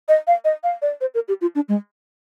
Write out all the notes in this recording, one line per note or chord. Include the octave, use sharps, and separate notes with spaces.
D#5
F5
D#5
F5
D5
C5
A#4
G4
F4
D4
G#3